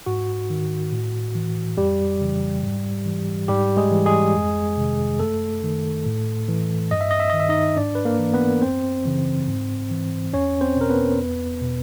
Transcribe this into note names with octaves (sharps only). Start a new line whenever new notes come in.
G#2 F#4
D#3
A2
E3
F2 G3 G4
C#3 E3
G#2
E3
G#2 G3 G4
G#3 G#4
E3
G#3 G#4
F2
C3 D#3
F#2 A3 A4
D#3
A2
E3
G2 D#5
E5
D#5
E5
D#3 D#5
E5
D#4 D#5
G#2 D4 D5
B4
A#3 A#4
E3
B3 B4
F#2 C4 C5
C#3 E3
G#2
E3
E2 C#4 C#5
C4 C5
B2 A#4
B3 B4
E2
B2